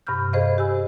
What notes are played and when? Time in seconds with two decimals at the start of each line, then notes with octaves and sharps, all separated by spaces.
0.07 G2 C3 B5 C#6 F6 G6
0.33 G#4 A4 C5 D#5 F5
0.58 G4 G#5 E6